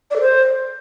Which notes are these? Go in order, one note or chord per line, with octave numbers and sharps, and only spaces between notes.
D5
A4
C5